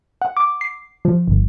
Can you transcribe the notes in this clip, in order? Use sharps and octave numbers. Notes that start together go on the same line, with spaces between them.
F#5
D6
C7
F3
G1